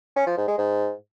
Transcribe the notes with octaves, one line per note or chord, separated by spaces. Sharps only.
C#4
F3
G#2
G#3
G#2